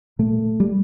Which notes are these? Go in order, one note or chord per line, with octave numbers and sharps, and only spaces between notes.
A#2 A3
G3